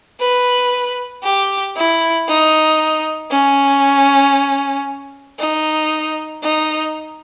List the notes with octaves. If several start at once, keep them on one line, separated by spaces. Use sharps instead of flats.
B4
G4
E4
D#4
C#4
D#4
D#4